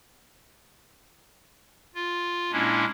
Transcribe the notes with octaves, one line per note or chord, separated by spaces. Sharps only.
F4
A#2 G#3 A#3 C#4 D4 E4